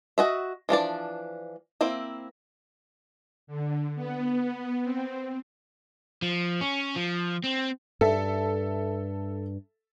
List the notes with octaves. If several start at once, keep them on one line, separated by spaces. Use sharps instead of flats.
F#4 D#5 E5
E3 F3 D4 D5
A#3 C4 E4
D3
B3
C4
F3
C#4
F3
C4
G2 A4 E5